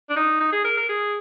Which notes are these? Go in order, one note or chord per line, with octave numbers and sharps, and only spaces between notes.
D4
D#4
D#4
G#4
A#4
A#4
G#4